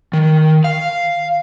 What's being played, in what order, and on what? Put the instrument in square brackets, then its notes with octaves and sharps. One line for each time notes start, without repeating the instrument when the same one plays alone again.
[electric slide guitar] D#3
F5